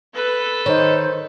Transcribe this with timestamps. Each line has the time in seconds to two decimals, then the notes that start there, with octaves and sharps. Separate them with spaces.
0.14 A4 B4
0.66 D#3 C5 C#5 D#5